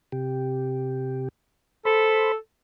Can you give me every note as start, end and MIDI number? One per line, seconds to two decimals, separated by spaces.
0.12 1.29 48
0.12 1.29 67
1.85 2.35 69
1.85 2.32 72
1.85 2.32 83